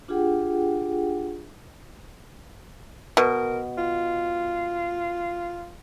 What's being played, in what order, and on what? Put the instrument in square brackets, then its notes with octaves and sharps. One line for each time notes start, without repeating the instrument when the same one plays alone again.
[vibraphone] D4 F4 G4 G#4 F#5 G5
[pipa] B2 [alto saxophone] A#4
[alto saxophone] F4